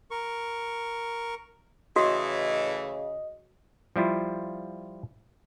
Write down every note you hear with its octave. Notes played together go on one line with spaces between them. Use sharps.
A#4 C#6
A2 C#3 E3 A3 F#4 D#5
F3 G3 E4 F4